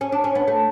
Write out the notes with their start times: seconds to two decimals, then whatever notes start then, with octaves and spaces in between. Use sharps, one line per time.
0.01 C#4
0.12 D4
0.24 C#4
0.35 B3
0.47 A3